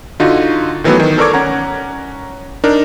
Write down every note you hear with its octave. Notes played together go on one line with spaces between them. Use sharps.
D3 D#4 F4 F#4
D#3 E3 F#3 A3 B3
D#3
A4 A#4 D5 C#6 D6 G#6
C#4 F#5 A#5
D4 D#4 A#4